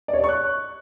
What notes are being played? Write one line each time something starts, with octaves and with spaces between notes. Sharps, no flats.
D5
C#5
D5
C#6
F#6